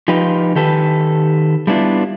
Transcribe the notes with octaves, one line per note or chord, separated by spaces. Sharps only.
F3 D#4 F4 G4 B4
D#3 G4 A4 B4
G3 A3 B3 D4 E4 F4